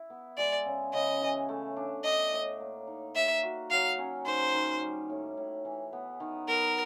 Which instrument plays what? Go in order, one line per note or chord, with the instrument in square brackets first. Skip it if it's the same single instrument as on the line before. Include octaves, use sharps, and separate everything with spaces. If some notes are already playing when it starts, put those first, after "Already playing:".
Already playing: [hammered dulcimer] E4
B3
[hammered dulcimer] G#3 [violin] D5
[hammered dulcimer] C#3
[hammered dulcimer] C#3 [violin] D#5
[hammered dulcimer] E3
A3
D4
[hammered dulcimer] D4 [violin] D#5
[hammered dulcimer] A2
A#3
D#4
[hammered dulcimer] A#3 [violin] E5
[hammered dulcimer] F#4
[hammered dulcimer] F#3 [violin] F5
[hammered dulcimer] C#4
[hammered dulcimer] D#3 [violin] C5
[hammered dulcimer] D#3
G3
A2
A2
E3
B3
D#3
[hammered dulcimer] B3 [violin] A#4